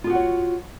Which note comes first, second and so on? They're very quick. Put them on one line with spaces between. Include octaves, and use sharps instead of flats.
F4 G#4 F#4 F#5 C#5